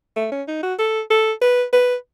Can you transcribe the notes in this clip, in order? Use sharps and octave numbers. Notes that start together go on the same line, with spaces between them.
A3
C#4
D#4
F#4
A4
A4
B4
B4